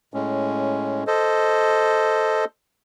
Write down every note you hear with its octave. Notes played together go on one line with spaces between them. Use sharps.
A2 G#3 C#4
A4 C5 D#5